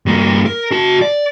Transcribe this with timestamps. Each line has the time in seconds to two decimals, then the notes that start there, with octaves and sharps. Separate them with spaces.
0.06 G2 A#3
0.46 A#4
0.71 F#4 A5
1.01 D5